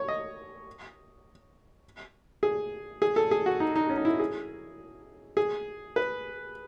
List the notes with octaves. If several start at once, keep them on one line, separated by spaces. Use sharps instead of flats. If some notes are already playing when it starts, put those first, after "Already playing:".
Already playing: C#5
D#5
G#4
G#4
A4
G#4
F#4
D#4
D#4
C#4
D#4
E4
G#4
G#4
B4